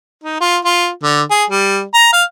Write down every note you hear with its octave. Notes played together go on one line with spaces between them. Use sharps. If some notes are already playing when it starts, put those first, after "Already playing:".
D#4
F4
F4
D3
G#4
G3
A#5
F5